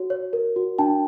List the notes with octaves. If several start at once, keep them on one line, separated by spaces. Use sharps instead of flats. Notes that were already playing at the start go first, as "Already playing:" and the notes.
Already playing: F#4 C#5
C#5
A#4
F#4
D4 G5 A5